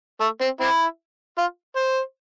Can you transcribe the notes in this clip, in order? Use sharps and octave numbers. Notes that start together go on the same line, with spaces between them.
A3
C4
C4 E4
F4
C5